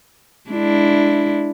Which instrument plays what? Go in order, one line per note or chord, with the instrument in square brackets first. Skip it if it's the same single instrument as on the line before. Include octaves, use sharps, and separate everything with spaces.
[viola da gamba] G#3 D4 E4